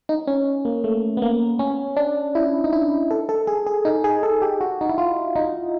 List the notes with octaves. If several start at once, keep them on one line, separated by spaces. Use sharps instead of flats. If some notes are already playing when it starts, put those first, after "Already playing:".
D#4
C#4
A#3
A3
B3
A#3
C#4
D4
E4
D#4
E4
A4
A4
G#4
G#4
D#4
G#4
A4
G4
F#4
D#4
E4
F4
D#4